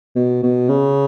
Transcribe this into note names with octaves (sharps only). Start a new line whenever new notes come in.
B2
B2
C#3